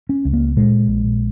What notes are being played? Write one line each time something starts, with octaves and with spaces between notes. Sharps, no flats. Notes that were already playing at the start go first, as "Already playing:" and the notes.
C#4
C#2
A#3
A#2 G#3
A#1